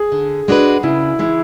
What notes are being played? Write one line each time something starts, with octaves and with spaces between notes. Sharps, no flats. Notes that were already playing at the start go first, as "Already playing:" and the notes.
Already playing: G#4
D3
G#3 D4 F#4 B4
C#3 E4
E3 G#3 E4